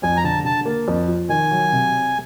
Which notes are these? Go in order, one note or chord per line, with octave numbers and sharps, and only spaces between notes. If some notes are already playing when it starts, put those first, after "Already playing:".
F2 G#5
A#5
D3 A5
D3 A5
A#3
F2
F3
D#3 G#5
F#3
C3